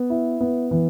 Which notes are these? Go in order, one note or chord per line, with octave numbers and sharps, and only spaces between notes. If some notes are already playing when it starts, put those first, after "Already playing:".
Already playing: B3
E4
B3
E3